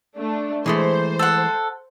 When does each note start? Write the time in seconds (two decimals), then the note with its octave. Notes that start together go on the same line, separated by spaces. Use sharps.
0.16 A3 D4
0.66 E3 G#3 A3 C5
1.19 A4 F#5